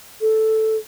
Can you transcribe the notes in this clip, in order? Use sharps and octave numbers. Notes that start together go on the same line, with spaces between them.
A4